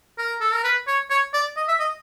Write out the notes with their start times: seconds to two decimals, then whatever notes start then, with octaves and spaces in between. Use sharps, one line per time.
0.18 A#4
0.40 A4
0.53 A#4
0.64 B4
0.87 C#5
1.10 C#5
1.34 D5
1.57 D#5
1.68 E5
1.79 D#5